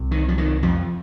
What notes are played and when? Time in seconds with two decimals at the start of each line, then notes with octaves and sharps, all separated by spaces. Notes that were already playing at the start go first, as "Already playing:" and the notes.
Already playing: C2 C3
0.11 D#3
0.28 F3
0.38 D#3
0.63 F2 F3